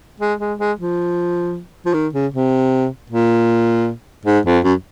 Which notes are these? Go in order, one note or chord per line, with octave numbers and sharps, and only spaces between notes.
G#3
G#3
G#3
F3
F3
D#3
C#3
C3
A#2
G#2
F2
F#2